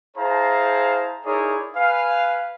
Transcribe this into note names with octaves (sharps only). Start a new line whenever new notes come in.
E4 G#4 C5 F5 A5 A#5
D#4 E4 G#4 A#4 C#5 D5
B4 F5 G#5